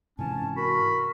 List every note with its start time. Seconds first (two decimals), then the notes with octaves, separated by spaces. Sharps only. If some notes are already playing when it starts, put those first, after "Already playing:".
0.19 G#2 C3 E3 C#4 A5
0.56 F#4 A#4 B5